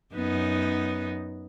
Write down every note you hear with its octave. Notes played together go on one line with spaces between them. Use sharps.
F#2 B3 D#4